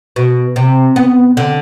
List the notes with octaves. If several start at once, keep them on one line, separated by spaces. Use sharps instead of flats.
B2
C3
B3
D3